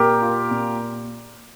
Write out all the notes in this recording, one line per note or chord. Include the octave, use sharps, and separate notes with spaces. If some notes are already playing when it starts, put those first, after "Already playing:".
Already playing: A#2 G4 A#4
F4
A#2